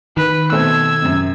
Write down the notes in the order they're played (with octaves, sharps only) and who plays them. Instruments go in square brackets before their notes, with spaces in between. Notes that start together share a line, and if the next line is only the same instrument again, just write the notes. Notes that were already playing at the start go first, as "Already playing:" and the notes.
[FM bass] D#3 [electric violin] B4
[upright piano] B2 A3 C4 [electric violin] E6 G#6
[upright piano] F#2 C3